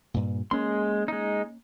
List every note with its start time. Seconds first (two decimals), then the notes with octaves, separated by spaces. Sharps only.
0.14 G2 A#2
0.51 G#3 A#3 C#4 C6
1.08 G#3 D#4